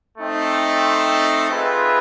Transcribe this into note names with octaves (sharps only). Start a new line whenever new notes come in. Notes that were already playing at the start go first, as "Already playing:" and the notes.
A3 C4 D#4
C4 F4 G#4 B4 E5